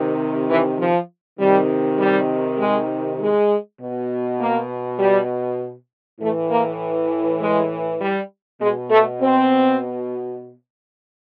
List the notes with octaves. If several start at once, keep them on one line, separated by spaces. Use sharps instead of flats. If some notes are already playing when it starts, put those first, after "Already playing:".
Already playing: C3 D#3
E3
F3
C3 D#3 G3
G3
G#3
G#3
B2
A#3
G3
A2 E3 A3
A#3
G#3
G3
B2 G#3
A3
C4